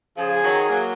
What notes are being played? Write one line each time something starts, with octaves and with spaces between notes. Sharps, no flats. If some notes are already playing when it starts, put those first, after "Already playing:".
C#3 F3 G#4
D#3 F#3
F#3 A#3